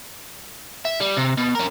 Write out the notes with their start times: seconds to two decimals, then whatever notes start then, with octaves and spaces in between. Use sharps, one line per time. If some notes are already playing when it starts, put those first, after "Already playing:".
0.85 E5
1.00 G3
1.17 C3
1.38 B2
1.56 C#4 A#4